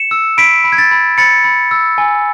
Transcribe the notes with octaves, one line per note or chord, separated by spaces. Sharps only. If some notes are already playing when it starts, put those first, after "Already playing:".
Already playing: C#7 E7
E6
B5 B6 D7
B5
G#6
A6
B5
B5 A6 C#7
B5
E6
G#5